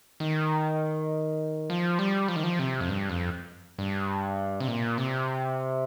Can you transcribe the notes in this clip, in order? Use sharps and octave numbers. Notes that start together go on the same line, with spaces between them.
D#3
F3
G3
F3
D#3
F3
C3
F2
G2
F2
G2
C3
A#2
C3